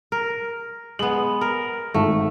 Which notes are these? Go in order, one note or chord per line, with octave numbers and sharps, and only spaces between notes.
A#4
G#3 B3 F#7
A#4
G#1 A3